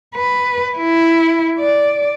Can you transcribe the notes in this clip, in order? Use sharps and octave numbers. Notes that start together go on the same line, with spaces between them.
B4
E4
D5